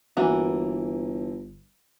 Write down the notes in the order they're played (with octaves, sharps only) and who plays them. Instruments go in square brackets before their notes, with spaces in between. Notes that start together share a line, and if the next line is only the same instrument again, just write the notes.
[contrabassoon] G1 [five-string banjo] E3 A#3 F#4